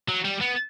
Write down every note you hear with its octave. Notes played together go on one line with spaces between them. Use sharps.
F#3
G3
B3